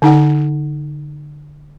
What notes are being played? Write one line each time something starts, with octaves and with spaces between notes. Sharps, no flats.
D3 D#4 F#5